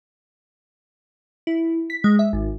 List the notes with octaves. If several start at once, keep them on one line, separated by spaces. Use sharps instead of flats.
E4
B6
G#3
E5
G#1